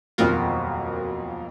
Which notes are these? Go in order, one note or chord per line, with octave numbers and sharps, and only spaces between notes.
D#1 B1 F2 F4 F#4 A#4